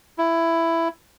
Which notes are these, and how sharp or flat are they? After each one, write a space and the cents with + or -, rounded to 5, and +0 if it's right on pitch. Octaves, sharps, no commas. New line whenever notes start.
E4 +10